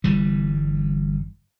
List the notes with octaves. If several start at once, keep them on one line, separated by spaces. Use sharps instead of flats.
G1 E3 G3